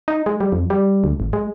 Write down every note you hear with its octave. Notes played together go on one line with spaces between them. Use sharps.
D#4
G#3
G3
F2
G3
D2
G#1
G#3